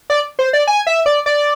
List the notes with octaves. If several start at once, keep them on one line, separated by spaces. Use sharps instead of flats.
D5
C5
D5
G#5
E5
D5
D5